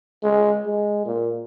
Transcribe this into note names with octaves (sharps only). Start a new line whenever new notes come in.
G#3
G#3
A#2